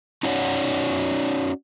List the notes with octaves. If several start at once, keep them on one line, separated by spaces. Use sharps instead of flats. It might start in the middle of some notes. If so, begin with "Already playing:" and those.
C#4 D#4 F#4 C#5 D5 F#5